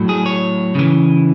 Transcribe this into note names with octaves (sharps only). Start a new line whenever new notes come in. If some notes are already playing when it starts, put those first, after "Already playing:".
Already playing: A2 F#3
G#4
C#5
C#3 E3